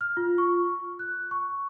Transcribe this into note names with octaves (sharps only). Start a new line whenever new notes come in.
F6
F4
C#6
F#6
C#6